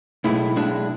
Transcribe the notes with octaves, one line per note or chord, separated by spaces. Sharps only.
B1 A2 G#3 E4
B1 A2 G#3 D4